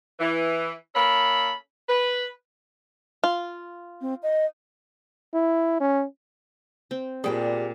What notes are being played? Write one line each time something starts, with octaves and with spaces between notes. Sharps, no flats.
E3
A#3 C#4 A4 B5
B4
F4
C4
D#5
E4
C#4
C4
A#2 G3 B3 D4 G#4 G5